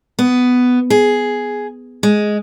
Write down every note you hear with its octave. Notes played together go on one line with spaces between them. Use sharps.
B3
G#4
G#3